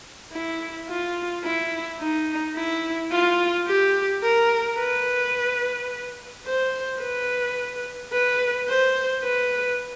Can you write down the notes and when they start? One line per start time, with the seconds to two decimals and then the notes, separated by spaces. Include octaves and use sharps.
0.33 E4
0.89 F4
1.44 E4
2.00 D#4
2.55 E4
3.12 F4
3.67 G4
4.23 A#4
4.79 B4
6.46 C5
7.02 B4
8.13 B4
8.69 C5
9.24 B4